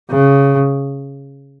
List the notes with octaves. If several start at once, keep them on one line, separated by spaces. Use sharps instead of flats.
C#3